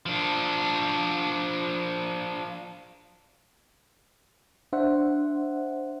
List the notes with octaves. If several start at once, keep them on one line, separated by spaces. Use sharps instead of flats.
F3 D4
D4 C5 E5 F#5